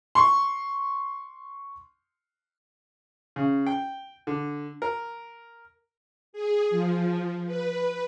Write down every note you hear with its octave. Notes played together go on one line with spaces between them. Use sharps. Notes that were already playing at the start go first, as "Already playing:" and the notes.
C6 C#6
C#3
G5
D3
A#4
G#4
F3
B4